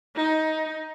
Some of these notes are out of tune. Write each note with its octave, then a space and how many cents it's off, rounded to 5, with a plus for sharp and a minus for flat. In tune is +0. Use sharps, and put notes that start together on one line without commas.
D#4 +15